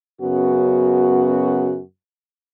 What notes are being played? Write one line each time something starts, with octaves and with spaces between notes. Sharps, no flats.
F#2 C#3 B3 F#4